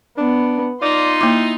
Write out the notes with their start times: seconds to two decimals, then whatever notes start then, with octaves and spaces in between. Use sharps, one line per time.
0.18 B3 D4
0.82 D#4 F4 D5 C6
1.21 A#3 E4 D6